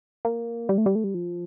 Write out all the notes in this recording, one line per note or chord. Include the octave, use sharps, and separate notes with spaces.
A#3
G3
A3
G3
A3
G3
F3